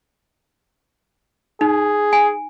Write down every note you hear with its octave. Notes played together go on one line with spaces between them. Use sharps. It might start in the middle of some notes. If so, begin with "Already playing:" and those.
D#4 G#4
G#5